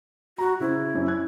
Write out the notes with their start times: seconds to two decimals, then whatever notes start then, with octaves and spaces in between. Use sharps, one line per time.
0.38 F#4 A#5
0.60 C#3 E4 C5
0.94 F#2 C#4
1.08 F#6 G#6